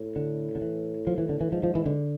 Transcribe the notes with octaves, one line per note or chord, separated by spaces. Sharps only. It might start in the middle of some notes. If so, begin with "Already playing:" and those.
Already playing: A2
D3
D3
E3
F3
E3
D3
E3
G#2 F3
F3
E3
D3